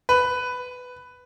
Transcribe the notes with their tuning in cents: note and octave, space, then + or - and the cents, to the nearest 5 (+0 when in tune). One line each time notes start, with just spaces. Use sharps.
B4 +10